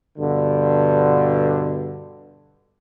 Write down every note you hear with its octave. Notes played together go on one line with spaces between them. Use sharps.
G2 B2 D3